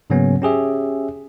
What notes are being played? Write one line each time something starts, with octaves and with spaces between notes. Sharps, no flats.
G#2 C#3 F#3 A#3 B3 C#4
C#4 G4 G#4 E5